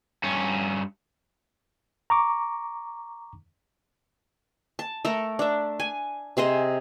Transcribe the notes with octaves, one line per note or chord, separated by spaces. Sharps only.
G2 C#4
A#5 C#6 D6
A5
A3 A4 A#4
D4 E5
G#5
C3 G#4 C5 D#5